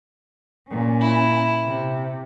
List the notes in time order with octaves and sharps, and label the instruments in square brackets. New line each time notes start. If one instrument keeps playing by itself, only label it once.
[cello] A#2 C#4
[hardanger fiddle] E4
[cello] C3